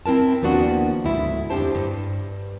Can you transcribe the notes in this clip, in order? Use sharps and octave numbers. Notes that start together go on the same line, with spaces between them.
C4 E4 A#4 A5
D#2 F3 A#3 B3 D4 F#4
D2 G#2 E4
F2 C3 D4 G4 C5 A5
G2